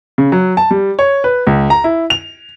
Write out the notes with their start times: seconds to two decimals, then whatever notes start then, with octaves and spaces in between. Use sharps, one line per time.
0.18 C#3
0.32 F#3
0.57 A5
0.71 G3
0.99 C#5
1.24 B4
1.47 C#2
1.70 A#5
1.84 E4
2.10 F7